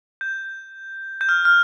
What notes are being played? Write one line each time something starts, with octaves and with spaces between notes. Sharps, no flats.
G6
G6
F6
F6